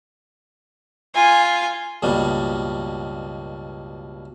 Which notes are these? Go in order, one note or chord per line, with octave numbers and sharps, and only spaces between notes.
F4 G#5
C#2 G2 B2 G3 A#3